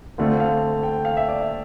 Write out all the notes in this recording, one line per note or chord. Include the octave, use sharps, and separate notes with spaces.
D2 D3 A3 C4 F4 D5
F5
G5
F5
E5
D5
E5